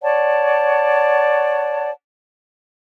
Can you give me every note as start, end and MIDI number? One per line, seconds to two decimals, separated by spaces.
0.02 1.89 73
0.02 1.89 74
0.02 1.89 78
0.02 1.89 81